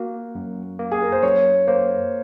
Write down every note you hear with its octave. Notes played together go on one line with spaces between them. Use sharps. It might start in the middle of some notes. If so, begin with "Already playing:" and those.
Already playing: A#3 F#4
F#2
A#3
G#4
A#4
C5
F#2 C#5
A#3 C5